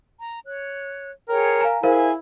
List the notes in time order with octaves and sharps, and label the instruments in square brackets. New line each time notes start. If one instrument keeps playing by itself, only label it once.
[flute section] A#5
C#5 F#6
[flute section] G#4 C#5 G5 [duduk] A#4
[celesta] F5 G#5 A#5
[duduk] E4 [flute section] G#4 E5 G#5 [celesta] A#4 C5 F5